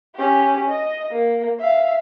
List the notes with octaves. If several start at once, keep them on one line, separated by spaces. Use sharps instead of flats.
C#4 G4
D#5
A#3
E5 F5